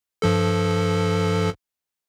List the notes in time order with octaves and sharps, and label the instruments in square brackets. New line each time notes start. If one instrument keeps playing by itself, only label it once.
[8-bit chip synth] G2 F3 A4